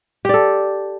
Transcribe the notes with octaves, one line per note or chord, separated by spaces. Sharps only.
G4 A4 D5